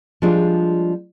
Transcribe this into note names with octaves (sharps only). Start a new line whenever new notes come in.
F3 G3 G#3 D4 F4